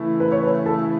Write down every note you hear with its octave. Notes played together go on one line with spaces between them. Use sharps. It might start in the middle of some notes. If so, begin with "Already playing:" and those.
Already playing: C#3 E3 A3 E4
B4
C#5
B4
A4